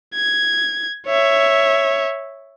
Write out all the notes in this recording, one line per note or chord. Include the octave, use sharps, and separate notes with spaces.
G#6
C#5 E5